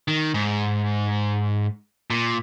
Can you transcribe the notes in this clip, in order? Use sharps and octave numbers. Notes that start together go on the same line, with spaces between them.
D#3
G#2
A#2